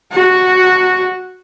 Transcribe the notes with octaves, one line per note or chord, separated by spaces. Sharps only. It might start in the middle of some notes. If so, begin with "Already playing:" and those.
F#4